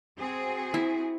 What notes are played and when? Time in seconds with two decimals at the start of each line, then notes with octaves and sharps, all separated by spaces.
0.18 C4 F#4 G#4
0.74 E4